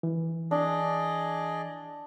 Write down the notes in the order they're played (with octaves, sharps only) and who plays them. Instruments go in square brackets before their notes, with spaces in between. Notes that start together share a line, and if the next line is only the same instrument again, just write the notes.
[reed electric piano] E3
[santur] D4 [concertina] G#4 D5 D#5